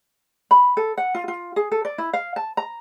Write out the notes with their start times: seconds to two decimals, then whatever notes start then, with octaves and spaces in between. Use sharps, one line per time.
0.51 B5
0.77 A4
0.98 F#5
1.15 F4
1.28 F4
1.56 G#4
1.72 A4
1.85 D5
1.98 E4
2.13 F5
2.36 A5
2.57 A#5